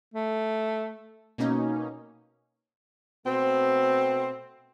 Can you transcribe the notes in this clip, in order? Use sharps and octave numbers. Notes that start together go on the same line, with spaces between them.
A3
B2 A#3 C#4 D#4
B2 A3 C4